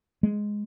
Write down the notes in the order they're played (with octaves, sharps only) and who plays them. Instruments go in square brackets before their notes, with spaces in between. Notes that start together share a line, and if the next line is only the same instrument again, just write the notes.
[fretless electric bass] G#3